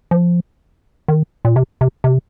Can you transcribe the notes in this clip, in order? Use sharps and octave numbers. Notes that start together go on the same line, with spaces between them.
F3
D#3
A#2
C3
C3
C3